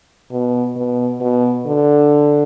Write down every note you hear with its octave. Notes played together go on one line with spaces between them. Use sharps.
B2
B2
B2
D3